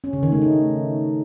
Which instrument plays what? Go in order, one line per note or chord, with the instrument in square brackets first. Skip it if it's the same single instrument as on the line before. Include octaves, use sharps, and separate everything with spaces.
[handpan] C#4
C#3
D#3
A3
D#4